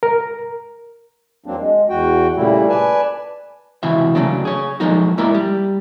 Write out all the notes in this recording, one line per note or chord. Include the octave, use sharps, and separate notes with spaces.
A#4
E2 F#3 A#3 C4 D4
G#3
E2 F#4 G5
A#2 C#3 G3 A3 E4
B4 D5 G#5 A5
C#2 C3 E3 F#4 E5
D2 G#2 C#3 F#3 A#3 D4
G#4 C#5
F3 F#3 G#3 A#3 D#4 F#4
G#3 A#3 E4 A#4 D5 E5
G3